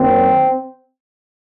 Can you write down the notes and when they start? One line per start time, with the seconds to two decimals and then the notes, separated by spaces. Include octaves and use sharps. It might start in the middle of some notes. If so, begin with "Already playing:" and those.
Already playing: F#2 D#3 F#3 A#3 C4